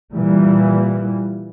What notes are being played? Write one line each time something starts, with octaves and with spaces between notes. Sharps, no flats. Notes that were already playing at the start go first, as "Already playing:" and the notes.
A#2 E3 G3